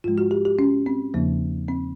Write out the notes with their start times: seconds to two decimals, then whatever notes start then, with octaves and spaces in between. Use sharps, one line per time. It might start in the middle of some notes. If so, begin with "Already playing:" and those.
0.04 G#2 F3 G#3 F4
0.18 F#4
0.31 G4
0.45 G4
0.59 C#4
0.86 C4
1.14 E2 C#3 F3 A#3
1.68 C4